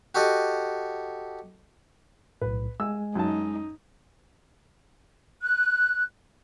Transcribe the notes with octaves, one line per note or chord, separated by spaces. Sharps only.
F#4 G4 A4 D#5 F#5
B1 A2 B4
G#3 G#5 E6
F#2 D#4 A5
F#6